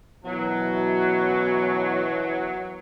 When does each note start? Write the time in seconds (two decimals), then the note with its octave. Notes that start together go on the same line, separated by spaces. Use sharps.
0.25 F#2 B2 E3 F#3